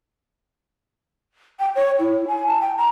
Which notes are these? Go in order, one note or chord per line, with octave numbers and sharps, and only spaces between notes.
G5
C#5
E4
G#5
A5
G5
A#5